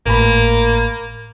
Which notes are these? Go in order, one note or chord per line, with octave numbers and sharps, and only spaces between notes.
G#1 A2 A#3 B5